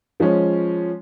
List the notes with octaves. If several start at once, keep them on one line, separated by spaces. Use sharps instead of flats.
F3 G#3 C#4